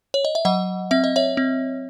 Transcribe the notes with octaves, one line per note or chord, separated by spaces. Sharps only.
C#5
D#5
E5
F#3 D#5 F#5
C4 E5
D#5
C#5 E5
C4